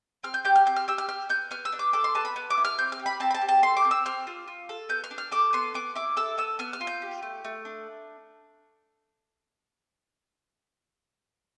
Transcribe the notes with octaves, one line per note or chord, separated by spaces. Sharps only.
C4 F6
G6
G4 G6
F6
C4 G6
F6
G4 E6
F6
G4 F6
B3 G6
B3 F6
E6
D4
D6
A4 D6
C6
B3 A5
B5
B3
D6
E4
F6
C4 G6
F6
G4
B5
C4 A5
B5
A5
G4
A5
A4 C6
D6
C4
E6
C4 F6
F4
F4
A4
B3 G6
F6
D4
F6
A4 D6
B3 C6
B3 D6
E4 D6
A4 E6
B3 E6
B3 F6
F6
F4
G6
G4
A3
A3
D4